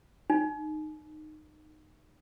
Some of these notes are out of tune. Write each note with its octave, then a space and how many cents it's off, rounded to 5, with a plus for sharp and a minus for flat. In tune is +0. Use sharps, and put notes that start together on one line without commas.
D#4 -20